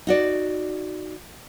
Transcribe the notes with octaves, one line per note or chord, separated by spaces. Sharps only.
D#4 F#4 D5